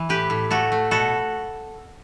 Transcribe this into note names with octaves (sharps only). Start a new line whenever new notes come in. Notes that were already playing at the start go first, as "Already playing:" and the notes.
Already playing: E3
A2 G4 B4
A2
A3 F#4 A4
A3
B2 F#4 A4